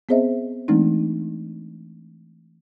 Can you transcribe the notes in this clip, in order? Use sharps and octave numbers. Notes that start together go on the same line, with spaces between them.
B3 C4 G#4 C5 D#5 E5
E3 G#3 A3 C4 D4 D#4